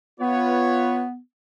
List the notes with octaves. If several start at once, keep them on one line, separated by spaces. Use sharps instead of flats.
B3 F4 B4 C#5